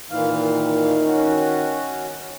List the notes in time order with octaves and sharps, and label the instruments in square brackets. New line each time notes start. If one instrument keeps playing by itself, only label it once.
[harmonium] A#2 E3 F5 [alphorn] D#3
[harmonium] C#4 F#4